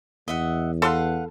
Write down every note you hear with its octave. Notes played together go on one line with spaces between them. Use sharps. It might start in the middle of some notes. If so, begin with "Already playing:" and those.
E2 D#5 E5 F#5
A4 B4 F5 F#5 C6